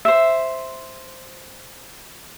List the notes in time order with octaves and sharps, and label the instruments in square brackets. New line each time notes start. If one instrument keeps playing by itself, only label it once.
[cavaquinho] C5 E5